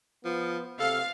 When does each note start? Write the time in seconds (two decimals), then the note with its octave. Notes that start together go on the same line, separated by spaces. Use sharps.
0.25 F3 B3
0.80 C3 A4 F5